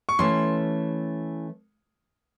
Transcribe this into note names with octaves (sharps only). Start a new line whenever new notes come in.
C#6
E3 A3 C#4 E4 A4 C6